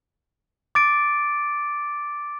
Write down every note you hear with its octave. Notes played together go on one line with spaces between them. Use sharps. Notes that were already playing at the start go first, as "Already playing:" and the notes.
D6 A6 D7